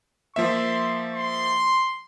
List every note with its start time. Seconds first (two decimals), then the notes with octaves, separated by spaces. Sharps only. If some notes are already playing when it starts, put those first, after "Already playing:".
0.36 F3 A#3 E5 C6
1.14 C6